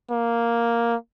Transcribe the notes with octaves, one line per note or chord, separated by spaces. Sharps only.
A#3